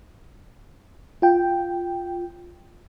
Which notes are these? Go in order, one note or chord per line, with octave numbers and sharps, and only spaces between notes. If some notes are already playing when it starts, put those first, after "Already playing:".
F4 G5